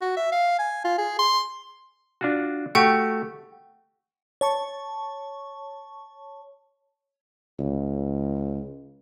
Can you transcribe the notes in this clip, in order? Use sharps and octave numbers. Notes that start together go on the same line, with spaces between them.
F#4
E5
F5
G#5
F4
G#4
C6
D4 F4 F#4
A3 F#4 G4 F#5 G5 C#6
C#5 A5 C#6
C#2